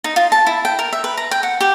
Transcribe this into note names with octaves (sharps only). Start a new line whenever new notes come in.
D#4
F4
A5
E4
G5
A#4
E5
B4
A#5
G5
F#5
G4